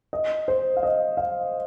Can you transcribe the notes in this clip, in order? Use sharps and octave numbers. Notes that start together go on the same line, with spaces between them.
D#5
C5
F5
D#5
F5